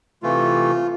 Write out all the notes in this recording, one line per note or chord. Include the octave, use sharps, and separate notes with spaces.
C3 E3 A3 F4